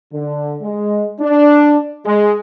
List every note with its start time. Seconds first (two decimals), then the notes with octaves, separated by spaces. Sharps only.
0.13 D3
0.62 G#3
1.20 D4
2.05 G#3